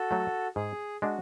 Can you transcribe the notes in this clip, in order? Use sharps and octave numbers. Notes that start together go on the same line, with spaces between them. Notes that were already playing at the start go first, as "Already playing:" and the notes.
Already playing: F#4 A4
F#3 A3
G#2 G#4
G#3 D4 F#4